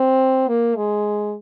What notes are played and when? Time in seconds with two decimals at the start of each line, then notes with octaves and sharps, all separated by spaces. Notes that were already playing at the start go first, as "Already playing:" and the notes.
Already playing: C4
0.48 A#3
0.76 G#3